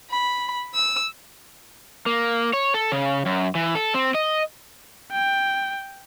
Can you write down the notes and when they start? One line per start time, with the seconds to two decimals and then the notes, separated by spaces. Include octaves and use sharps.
0.11 B5
0.75 E6
2.06 A#3
2.53 C#5
2.74 A4
2.92 C#3
3.26 F#2
3.55 E3
3.75 A4
3.94 C4
4.15 D#5
5.12 G5